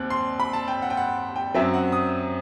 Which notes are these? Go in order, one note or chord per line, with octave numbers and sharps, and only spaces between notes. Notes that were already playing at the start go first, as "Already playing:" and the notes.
Already playing: D#2 C4 F#6
C6
B5
A5
G5
F#5
G5
F#5
G5
F#2 F#3 C4 E5
F#5
D#6